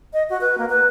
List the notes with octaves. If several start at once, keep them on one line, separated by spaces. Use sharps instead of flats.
D#5
F#4
B4
A#3
B4